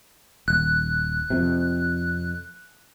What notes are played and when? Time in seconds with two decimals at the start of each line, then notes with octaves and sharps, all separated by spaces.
0.48 D#1 F#6
1.30 F2 C3